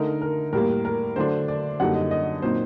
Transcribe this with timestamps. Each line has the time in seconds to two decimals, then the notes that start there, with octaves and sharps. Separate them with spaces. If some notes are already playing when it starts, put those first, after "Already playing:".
Already playing: D3 A3 D#4 A#4
0.21 A#4
0.53 A2 G3 A#3 A#4
0.85 A#4
1.16 D3 F#3 A3 D4 C5
1.48 D5
1.80 F#2 D3 G3 A#3 D#4 F#5
1.95 D#5
2.11 D#5
2.42 A#2 F#3 C4 D#4 C5